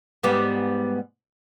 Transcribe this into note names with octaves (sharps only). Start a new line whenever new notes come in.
G#2 G3 B3